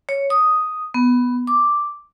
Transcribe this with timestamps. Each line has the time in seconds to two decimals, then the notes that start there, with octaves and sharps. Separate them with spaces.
0.09 C#5
0.30 D#6
0.94 B3
1.47 D6